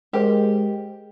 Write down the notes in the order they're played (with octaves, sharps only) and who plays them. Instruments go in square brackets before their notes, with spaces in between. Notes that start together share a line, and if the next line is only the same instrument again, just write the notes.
[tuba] G#3 [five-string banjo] G4 A#4 C5